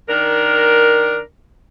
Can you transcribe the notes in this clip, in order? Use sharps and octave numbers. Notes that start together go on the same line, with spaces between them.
D#3 D4 A#4